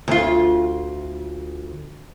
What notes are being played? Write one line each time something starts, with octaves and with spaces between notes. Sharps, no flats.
D2 F4